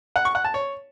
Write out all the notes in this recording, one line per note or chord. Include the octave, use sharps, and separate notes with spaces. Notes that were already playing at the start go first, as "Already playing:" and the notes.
F#5
C#6
F#5
A5
C#5